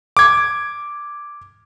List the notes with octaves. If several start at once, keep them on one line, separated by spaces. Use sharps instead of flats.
D6 G#6